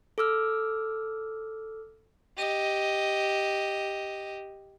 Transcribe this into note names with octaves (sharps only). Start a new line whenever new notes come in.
A4 D6 E6 F6
G4 D#5